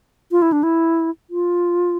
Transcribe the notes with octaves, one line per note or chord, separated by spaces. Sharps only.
F4
E4
D4
E4
F4